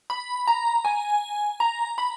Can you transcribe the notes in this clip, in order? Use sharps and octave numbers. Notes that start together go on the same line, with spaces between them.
B5
A#5
G#5
A#5
B5